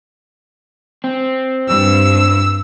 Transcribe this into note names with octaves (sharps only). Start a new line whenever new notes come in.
C4
G2 E6